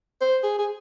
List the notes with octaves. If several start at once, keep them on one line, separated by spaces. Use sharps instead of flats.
C5
G#4
G#4